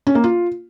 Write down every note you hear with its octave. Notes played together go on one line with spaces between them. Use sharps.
C#4
A#3
F4